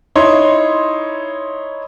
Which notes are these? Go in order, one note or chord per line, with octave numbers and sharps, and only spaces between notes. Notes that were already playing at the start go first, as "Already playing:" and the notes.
D#4 E4 C#5 C6